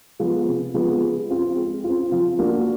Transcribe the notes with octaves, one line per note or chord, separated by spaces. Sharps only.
F3 G#3 B3
C3
F3 G#3 B3
G#3
C4 F4
G#3
F4
C4
F3
A#3 D4 F#4